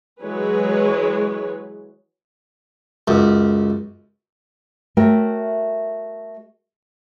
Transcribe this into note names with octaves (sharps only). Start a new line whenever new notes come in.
E3 F#3 G#3 G#4 B4 C#5
C#2 F#2
A3 F#4 A#4 C#5 E5 G5